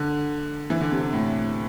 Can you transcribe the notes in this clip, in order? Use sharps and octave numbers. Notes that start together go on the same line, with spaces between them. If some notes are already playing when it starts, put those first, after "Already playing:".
Already playing: D3
E3
D3
C3
C3
A2